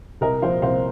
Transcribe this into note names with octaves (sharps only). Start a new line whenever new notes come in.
C2 A#4 D#5
A#2 F3 C5 F5
C2 C5 F5